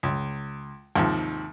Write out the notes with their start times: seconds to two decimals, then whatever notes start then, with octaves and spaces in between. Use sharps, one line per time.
0.03 C#2
0.96 D#2 G#2 C3 F3